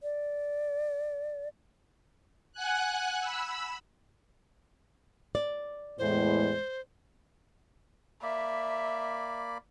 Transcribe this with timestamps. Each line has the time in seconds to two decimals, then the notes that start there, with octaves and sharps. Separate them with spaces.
0.03 D5
2.53 F#5 G#5 F#6
3.20 B5 E6
5.35 D5
5.99 E2 A2 G#3 C5
8.23 A#3 D5 E5 B5